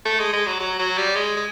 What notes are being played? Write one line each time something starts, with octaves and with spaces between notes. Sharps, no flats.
A3
G#3
G#3
F#3
F#3
F#3
G3
G#3
G#3